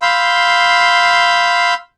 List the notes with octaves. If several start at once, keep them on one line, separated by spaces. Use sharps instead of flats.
F5 B5 C6 E6 G6